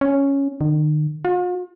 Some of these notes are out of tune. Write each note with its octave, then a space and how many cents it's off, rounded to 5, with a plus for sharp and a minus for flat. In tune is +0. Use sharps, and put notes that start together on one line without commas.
C#4 +0
D#3 -40
F4 +45